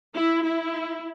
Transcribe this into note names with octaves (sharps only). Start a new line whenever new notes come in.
E4
E4